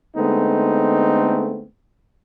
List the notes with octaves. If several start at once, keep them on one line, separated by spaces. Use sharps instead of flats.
D3 G#3 A3 B3 C4 D#4